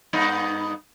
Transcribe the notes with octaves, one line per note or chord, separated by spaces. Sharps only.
G2 B3 D#4